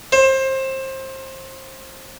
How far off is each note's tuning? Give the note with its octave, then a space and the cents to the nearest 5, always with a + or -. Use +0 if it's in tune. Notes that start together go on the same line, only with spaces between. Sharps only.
C5 +25